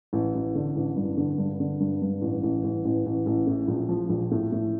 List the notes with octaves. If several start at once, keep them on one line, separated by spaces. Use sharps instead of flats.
A1
A1
D3
A1
G2
D3
G2
D3
G2
G2
A1
A1
A1
A1
A1
A1
A2
A#1
F3
A#1
A2
A2